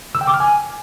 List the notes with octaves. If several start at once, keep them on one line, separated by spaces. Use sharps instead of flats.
E6
G5
D6
F6
G#5